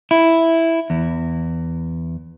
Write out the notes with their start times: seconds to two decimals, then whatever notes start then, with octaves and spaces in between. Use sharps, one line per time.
0.11 E4
0.90 E2